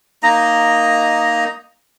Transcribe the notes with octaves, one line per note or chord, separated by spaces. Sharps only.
A#3 D#4 D#5 A#5